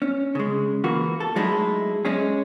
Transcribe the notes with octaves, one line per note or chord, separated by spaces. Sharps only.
C#4
C#3 G#3
E3 A#3 F#4
A4
F#3 G#3 A3 D#4 E4
G#3 C#4 G#4